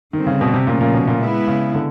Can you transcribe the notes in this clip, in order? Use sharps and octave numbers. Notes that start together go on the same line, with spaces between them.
D3 D#3 G3 C4
C#3
B2
C3
A#2 C#3 F3 A3 C#4
A#2
B2
A#2
G#3 B3 E4
C#3
D3